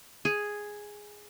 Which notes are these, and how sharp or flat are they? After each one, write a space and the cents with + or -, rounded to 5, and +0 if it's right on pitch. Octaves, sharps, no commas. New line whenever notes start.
G#4 +0